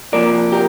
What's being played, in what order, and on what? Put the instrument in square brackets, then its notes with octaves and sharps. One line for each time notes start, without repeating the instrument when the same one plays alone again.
[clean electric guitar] C3 F3 A#3 A#4 D5
G4 A#4